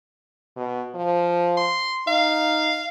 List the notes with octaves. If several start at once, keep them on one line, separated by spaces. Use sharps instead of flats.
B2
F3
C6
D#4 F5